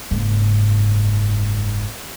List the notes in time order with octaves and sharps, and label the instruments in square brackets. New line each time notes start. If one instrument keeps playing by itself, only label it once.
[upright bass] F#1 G#2